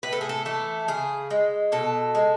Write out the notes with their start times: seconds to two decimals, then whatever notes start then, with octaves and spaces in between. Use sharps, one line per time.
0.03 A2 B4
0.13 A4
0.21 G#4
0.29 A4
0.45 E3 A3 A4
0.88 C#3 G#4
1.30 G#3
1.72 B2 A4
2.15 G#3